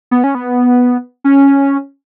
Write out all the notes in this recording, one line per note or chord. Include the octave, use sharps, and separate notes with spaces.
B3
C#4
B3
C#4